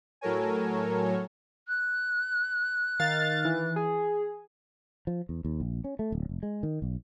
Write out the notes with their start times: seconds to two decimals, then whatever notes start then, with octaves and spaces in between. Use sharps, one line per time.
0.21 A2 F#3 A4 A#4 C#5 G#5
1.67 F#6
3.00 D#3 F5 A6
3.45 E3
3.76 G#4
5.07 F3
5.29 E2
5.45 D#2
5.60 A#1
5.84 C#4
5.99 A3
6.12 D1
6.29 F1
6.43 G#3
6.63 D#3
6.82 B1